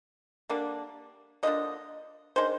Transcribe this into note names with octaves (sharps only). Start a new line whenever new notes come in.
D3 G3 A#3 D4
D3 F3 A#3 D4 D#5
D#3 G#3 D4 C5